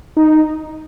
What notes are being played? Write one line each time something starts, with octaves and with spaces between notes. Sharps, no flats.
D#4